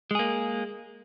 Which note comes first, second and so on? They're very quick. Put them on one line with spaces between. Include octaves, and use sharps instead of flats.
G#3 G#4 A#3